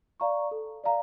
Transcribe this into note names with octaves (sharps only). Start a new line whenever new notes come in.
D5 F5 A#5 C#6
A4
D5 F5 A#5